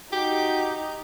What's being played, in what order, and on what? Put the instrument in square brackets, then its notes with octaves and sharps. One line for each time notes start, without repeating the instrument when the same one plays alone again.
[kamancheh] D#4 [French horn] F#4 [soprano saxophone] G4